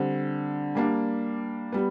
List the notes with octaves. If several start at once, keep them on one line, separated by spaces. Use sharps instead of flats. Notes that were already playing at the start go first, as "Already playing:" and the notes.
Already playing: D3 G3 C4
G3 A#3 D4
G3 B3